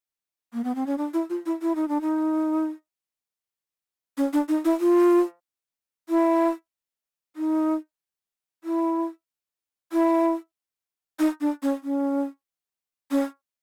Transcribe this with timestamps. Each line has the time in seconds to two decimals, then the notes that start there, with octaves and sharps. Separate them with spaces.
0.53 A#3
0.64 B3
0.75 C4
0.86 C#4
0.98 D4
1.14 E4
1.30 F4
1.46 E4
1.62 E4
1.75 D#4
1.88 D4
2.01 D#4
4.17 C#4
4.33 D4
4.48 D#4
4.65 E4
4.80 F4
6.09 E4
7.36 D#4
8.64 E4
9.93 E4
11.19 D#4
11.41 D4
11.63 C#4
11.84 C#4
13.11 C#4